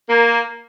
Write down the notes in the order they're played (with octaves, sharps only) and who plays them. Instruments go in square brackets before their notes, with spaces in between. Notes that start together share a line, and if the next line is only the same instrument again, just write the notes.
[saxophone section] A#3